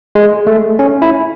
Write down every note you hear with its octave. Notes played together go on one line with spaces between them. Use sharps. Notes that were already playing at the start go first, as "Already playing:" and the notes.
G#3
A3
C#4
E4